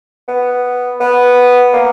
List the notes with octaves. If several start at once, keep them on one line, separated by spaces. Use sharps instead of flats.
B3
B3
A#3